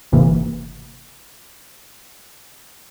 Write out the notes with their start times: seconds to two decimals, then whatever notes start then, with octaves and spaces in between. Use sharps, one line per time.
0.12 G1 G#2 C3 E3 A#3